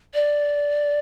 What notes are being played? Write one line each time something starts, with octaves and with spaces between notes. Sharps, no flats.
D5